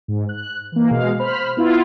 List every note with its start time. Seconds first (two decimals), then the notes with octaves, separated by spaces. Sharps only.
0.08 G#2
0.29 F#6
0.72 E3 A#3
0.90 B2 G#3 F5
1.19 C5 B5 F6
1.57 B3 E4 F4